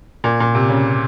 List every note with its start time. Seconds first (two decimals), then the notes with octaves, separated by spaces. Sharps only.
0.24 A#2
0.40 A#2
0.55 C3
0.69 C#3